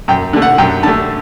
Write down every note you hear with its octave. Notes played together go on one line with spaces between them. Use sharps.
F#2 G5
D3 A3
F#5
F#2 G5
D3 A3 A5